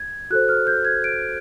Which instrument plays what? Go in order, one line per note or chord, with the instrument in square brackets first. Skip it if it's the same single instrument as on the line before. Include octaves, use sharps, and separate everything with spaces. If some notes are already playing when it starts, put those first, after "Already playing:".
Already playing: [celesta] G#6
F#4 A4 C5 F#6
F6
G6
G#6
D7